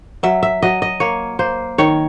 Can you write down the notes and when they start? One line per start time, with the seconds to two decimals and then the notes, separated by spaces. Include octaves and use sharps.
0.23 F#3 E5
0.43 E5
0.62 F#3 D#5
0.82 D#5
1.00 A#3 C#5
1.39 A#3 C5
1.78 D#3 C#5